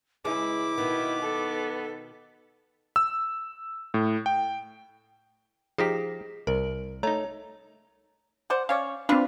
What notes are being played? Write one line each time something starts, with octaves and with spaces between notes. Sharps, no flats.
C#3 E3 G#3 E4 D6
B2 D#3 B3
A4
E6
A2
G5
F3 D#4 G4 G#4 A#6 B6
C2 A#4
A3 D#4 C#5 A#5
C5 D5 F#5
C#4 C#5 D5 F5
C4 D4 F4 B4 F5